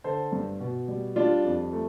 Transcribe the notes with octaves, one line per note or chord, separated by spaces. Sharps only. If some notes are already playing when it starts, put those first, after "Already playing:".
D3 A4 C5
G2
B2
G3
G3 D4 F4
F2
A3